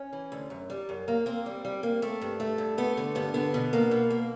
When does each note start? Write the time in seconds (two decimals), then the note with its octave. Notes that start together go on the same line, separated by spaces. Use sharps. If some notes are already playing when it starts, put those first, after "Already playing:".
Already playing: C#4
0.13 E3
0.32 D2
0.50 F#2
0.70 G3
0.89 F#2
1.08 A#3
1.26 A#3 C4
1.46 G3
1.65 G3
1.83 A#3
2.02 A3
2.21 G2
2.40 A3
2.58 G2
2.78 A3 B3
2.97 D3
3.15 G2 B3
3.34 D3 B3
3.54 B2
3.73 A#3
3.91 B2
4.10 A#3